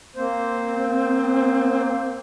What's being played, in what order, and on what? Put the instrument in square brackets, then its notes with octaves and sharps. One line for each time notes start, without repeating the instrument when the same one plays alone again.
[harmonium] A#3 C5 [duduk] C4